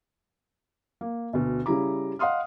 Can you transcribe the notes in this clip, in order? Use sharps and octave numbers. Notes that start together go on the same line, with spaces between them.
A#3
D2 B2
C#3 G3 E4 A#5 D6
D#5 F5 F#5 C6 D#6 F6